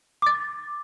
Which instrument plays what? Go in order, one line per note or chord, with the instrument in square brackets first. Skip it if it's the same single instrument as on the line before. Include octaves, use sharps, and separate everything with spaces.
[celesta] D6 A6